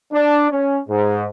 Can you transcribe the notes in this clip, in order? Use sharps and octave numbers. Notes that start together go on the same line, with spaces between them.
D4
C#4
G#2